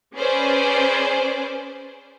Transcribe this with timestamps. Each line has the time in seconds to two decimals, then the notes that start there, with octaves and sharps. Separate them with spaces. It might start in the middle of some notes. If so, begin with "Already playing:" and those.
0.15 C#4 G#4 B4 C5 D5